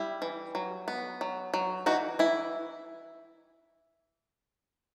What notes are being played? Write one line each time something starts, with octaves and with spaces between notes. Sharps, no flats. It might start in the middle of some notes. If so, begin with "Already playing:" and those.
Already playing: G3 E4
E3
F#3
B3
F#3
F#3
E3 D#4 F#4
E3 E4